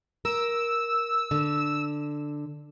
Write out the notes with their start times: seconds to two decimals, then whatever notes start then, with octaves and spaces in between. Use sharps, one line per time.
0.25 A#4 E6
1.31 D3